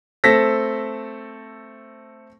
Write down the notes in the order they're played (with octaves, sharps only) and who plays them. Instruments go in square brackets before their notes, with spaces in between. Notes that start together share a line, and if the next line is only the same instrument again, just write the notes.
[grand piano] A3 C4 A4 A#6 B6